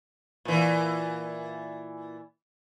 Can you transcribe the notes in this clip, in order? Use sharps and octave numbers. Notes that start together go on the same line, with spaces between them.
A#2 E3